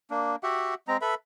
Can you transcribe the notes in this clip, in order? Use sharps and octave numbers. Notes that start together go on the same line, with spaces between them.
A#3 D4
F#4 G4 E5 F#5
G#3 C4 A#5
A4 B4 E5 B5